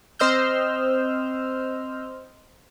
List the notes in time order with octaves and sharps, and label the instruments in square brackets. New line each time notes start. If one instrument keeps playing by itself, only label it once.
[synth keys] C4 C5 D#5 E6 F6 G6